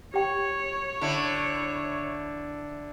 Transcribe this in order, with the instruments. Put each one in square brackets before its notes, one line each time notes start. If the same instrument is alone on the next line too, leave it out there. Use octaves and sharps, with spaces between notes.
[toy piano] G4 G5 [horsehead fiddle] C#5
[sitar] D3 E4